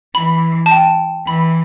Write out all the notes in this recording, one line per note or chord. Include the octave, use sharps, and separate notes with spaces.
E3 B5
A5
G5
E3 B5